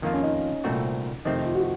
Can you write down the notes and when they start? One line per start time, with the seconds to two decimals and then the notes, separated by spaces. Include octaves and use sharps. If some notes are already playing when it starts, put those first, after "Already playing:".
0.02 F2 D#3 A#3 F4
0.13 C#4
0.23 D#4
0.64 C2 A#2 A3 C4 F#4
1.25 F2 C3 D#3 A3 C4 D#4
1.36 D#4
1.45 F4
1.55 F#4